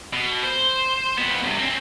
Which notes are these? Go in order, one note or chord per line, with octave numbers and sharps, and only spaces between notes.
B2
C5
F2 B3
G2 C3
C4 C#4